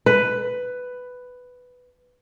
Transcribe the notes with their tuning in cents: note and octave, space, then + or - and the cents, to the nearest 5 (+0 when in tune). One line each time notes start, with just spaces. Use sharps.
B4 +10